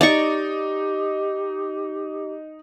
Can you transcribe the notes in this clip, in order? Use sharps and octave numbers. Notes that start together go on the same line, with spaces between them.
D#4 G4 D5 A#5 C#6